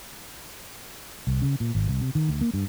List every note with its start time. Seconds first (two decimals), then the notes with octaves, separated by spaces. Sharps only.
1.27 C2
1.42 C#3
1.60 A#2
1.75 G#1
1.88 C2
2.01 C3
2.15 D#3
2.29 D2
2.41 A#3
2.54 G2